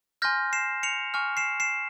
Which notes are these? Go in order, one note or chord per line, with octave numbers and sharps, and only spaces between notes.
G#5 C6 F6 G6 A#6
C7 E7
C#7 F7
G#5 C#6 F6
C7 E7
C7 E7